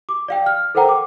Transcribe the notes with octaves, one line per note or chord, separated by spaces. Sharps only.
D6
D5 F5 G5
F6
A4 A#4 C5 F#5 G5 A#5
D6